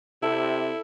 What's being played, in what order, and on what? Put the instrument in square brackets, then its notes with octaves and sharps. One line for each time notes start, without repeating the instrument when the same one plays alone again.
[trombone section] C3 [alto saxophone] E4 [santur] A4